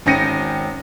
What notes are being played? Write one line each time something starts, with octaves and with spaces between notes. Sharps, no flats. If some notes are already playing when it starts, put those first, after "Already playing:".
G#1 C#4 G5 A#6 C#7 D#7